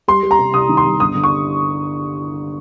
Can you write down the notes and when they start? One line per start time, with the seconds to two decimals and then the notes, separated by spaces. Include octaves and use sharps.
0.08 G3 C6
0.23 G3
0.31 A#5
0.39 C3
0.54 C2 D#6
0.69 D#3
0.77 C6
0.85 C2
1.00 G1 D#6
1.15 G1
1.24 C#6